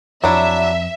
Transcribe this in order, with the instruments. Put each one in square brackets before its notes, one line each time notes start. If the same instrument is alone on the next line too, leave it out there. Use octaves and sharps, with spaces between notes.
[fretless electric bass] F2 [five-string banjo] F#3 D4 E4 [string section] E5